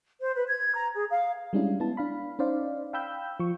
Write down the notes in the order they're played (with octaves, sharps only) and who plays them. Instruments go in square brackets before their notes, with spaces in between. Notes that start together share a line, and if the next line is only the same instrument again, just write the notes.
[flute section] C5
B4
G#6
A#5
G#4
F5
[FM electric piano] G3 G#3 C#4 D4 E4
B3 E4 A5
D4 F5 B5
C#4 D#4 C5 D5 F5
F5 G5 B5 E6 G6
F3 C#6